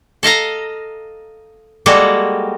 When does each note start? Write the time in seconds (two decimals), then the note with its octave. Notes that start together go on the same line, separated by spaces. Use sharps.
0.23 A4 D#5 F5 A#5
1.86 G3 G#3 A#3 F#4 A4